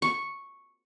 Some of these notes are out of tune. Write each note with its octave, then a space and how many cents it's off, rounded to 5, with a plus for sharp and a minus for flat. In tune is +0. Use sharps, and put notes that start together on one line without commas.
C#6 -5